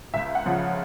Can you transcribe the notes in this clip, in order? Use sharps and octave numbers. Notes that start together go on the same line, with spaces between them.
C#2 E5
F#5
C#3 F3